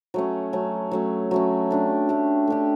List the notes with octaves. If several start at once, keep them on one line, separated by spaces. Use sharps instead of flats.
F#3 A3 C#4
F#3 A3 C#4
F#3 A3 C#4
F#3 A3 C#4
A3 D4 G4
A3 D4 G4
A3 D4 G4